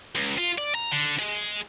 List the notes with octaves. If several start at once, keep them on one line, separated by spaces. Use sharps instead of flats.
C#2
F4
D5
A#5
D3
G#3